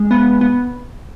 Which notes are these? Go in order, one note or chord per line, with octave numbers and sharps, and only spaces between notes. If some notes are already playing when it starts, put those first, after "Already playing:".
Already playing: G#3
B3
B3